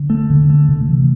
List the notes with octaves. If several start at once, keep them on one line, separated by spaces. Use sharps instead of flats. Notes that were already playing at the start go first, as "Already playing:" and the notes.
Already playing: D3
A3
D3
A3
C3
E3